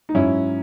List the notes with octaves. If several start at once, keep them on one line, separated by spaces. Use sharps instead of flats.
D#4
G#2 F#3 C#4 E4